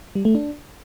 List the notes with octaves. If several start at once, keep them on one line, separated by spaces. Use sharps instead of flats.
G3
A3
D4